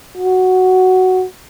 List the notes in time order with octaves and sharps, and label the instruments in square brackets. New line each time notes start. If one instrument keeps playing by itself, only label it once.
[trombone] F#4